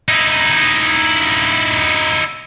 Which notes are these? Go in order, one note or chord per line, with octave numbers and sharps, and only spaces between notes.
D#4 E4